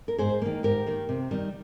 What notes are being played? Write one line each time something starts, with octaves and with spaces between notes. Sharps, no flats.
A#4
G#2 G#4 C5
D#3 A#3
G#2 G4 A#4
D#3 A#3
C3
D#3 G3